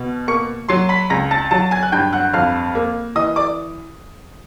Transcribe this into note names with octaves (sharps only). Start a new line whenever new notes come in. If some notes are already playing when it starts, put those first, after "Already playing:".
Already playing: B2
A#3 C#6 C#7
F#3 C6 C7
B5 B6
C#2 A#5 A#6
A5 A6
F#3 A5 A6
G#5 G#6
F#6
G2 G5 G6
F#5 F#6
F2 F5 F6
A#3
E3 D#5 D#6
D5 D6